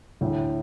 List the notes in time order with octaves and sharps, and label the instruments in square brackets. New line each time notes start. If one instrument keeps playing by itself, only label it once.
[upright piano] D2 [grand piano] A2